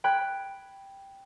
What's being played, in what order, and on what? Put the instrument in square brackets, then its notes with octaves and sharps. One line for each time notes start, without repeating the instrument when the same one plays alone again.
[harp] G5 B5 F#6 G#6